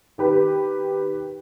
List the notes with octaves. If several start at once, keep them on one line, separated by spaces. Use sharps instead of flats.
D#3 G4 B4